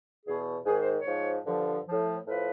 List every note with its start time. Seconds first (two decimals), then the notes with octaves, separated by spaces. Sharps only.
0.26 E2 B2 G#4
0.66 G#2 D#3 G#4
0.79 C5
0.94 C#5
1.06 G#2 F3
1.47 G2 D3 F3
1.87 A2 F3
2.27 A2 F3 B4